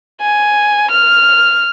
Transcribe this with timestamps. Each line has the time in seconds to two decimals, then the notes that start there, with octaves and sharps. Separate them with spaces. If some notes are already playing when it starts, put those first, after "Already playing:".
0.21 G#5
0.92 F6